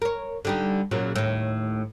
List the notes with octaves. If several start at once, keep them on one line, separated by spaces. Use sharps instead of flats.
A#4 C#5
D3 G3 D#4
A#2 C#3 F#3
D#2 A2